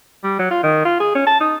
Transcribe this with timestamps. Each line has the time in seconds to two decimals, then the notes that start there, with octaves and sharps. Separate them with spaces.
0.24 G3
0.39 F#3
0.51 F4
0.63 D#3
0.85 F4
1.00 G#4
1.15 C#4
1.27 A5
1.40 D#4